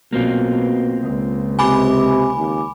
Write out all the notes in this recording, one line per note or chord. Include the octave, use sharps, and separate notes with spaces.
B1 B2 A#3 C4 F4
C#2
C3 G#5 B5 D6
D#2